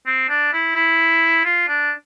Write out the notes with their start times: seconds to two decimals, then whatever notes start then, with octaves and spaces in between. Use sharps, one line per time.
0.07 C4
0.29 D4
0.53 E4
0.75 E4
1.45 F4
1.68 D4